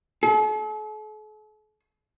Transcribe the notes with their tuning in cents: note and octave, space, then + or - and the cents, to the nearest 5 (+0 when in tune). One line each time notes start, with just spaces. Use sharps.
A4 -45